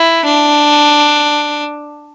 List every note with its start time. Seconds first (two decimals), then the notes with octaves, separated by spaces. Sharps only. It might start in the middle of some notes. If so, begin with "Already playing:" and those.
Already playing: E4
0.25 D4